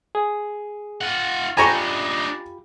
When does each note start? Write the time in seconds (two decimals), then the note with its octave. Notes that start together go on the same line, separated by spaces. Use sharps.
0.15 G#4
1.02 F4 F#5
1.57 D4 D#4 F4 G4 G#5 A#5 B5 C#6